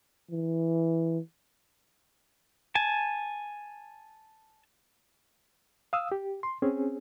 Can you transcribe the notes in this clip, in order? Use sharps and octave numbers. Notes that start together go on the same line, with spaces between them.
E3
G#5 A5
F5 D#6 E6
G4
C6
C4 C#4 G#4